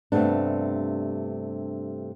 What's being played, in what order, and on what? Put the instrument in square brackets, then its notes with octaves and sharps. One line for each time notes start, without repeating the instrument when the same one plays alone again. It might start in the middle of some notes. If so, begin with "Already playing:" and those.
[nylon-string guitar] G2 C3 A3 B3 D4